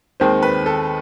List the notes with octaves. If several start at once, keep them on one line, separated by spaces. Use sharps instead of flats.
D#2 D#3 G#3 C4 C5
B4
A4